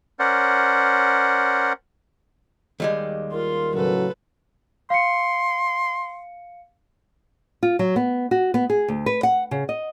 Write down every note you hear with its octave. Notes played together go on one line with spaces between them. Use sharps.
C#4 A#4 C5 D5 F#5
D#2 G3 G#3
F4 A#4 C6
A2 C#3 F#3 A4 B4
F5 C6 C#7
F4
F#3
B3
F#4
B3
G#4
D2
B4
F#5
C#3
D#5